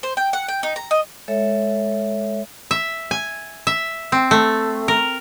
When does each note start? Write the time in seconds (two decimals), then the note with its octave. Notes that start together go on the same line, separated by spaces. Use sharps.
0.03 C5
0.17 G5
0.33 F#5
0.48 G5
0.63 D#4
0.76 A#5
0.91 D#5
1.28 G#3 A4 C#5 E5
2.71 E5
3.11 G#5
3.67 E5
4.12 C4
4.31 A3
4.88 A#4